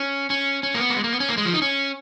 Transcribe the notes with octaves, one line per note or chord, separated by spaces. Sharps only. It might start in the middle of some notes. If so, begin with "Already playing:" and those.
Already playing: C#4
C#4
C#4
A#3
B3
A#3
G#3
A#3
B3
C#4
A#3
G#3
F3
D#4
C#4